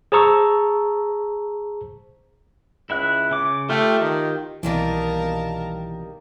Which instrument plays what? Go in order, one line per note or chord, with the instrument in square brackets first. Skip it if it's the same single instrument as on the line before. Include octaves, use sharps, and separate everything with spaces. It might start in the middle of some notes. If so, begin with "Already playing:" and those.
[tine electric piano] G#4 C5 A5 A#5 C#6 E6
[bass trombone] C#2 [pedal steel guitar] E4 E5 F#6
[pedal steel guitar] C#3 D6
[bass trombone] A3 [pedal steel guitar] F4 G4 G5
[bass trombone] D#3
[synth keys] C2 B2 [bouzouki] D#3 G3 A#3 [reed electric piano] E3 [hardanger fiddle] A#4 A5